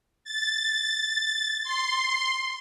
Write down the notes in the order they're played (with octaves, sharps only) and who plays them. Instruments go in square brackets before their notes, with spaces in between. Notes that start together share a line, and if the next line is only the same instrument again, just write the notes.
[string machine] A6
C6